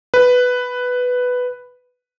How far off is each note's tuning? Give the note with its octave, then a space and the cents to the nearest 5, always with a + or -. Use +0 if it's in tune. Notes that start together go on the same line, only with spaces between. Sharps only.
B4 +5